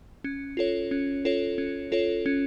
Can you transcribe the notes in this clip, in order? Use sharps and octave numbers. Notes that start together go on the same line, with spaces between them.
C#4
F4 A4 C#5
C#4
F4 A4 C#5
C#4
F4 A4 C#5
C#4